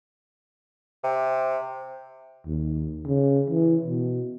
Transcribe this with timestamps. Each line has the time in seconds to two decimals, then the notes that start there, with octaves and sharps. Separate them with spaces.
1.04 C3
2.47 D#2
3.06 C#3
3.50 E3
3.85 B2